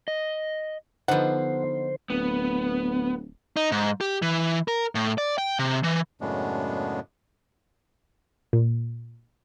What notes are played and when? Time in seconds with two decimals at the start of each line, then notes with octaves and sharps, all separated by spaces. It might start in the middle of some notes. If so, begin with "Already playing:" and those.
0.08 D#5
1.08 D3 F3 B3 D#4 C5 F#5
2.10 D1 B3
3.57 D#4
3.72 G#2
4.01 G4
4.22 E3
4.68 A#4
4.95 A2
5.18 D5
5.38 G5
5.59 C3
5.84 E3
6.21 F#2 A2 C#3 G#3 B3 D4
8.53 A#2